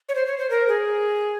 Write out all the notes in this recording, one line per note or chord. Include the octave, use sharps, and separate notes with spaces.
C#5
C5
C#5
C5
A#4
G#4